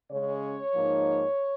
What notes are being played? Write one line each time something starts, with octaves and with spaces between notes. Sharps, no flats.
C#3 G#3 C#4 C#5
G#2 F3 A#3 D#4